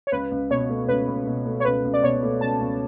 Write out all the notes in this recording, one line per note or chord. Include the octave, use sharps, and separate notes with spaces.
C#5
C#2 B4
C#2
B2 C#5
A3
C#2 B4
C#2
B2
A3
C#5
C#2 B4
C#2
D5
B2 C#5
A3
C#2 A5
C#2